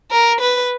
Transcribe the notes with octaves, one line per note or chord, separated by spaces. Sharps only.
A#4
B4